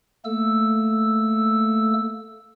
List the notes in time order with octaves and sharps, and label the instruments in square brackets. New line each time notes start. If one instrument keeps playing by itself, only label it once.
[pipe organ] A3 A#3 A4 E6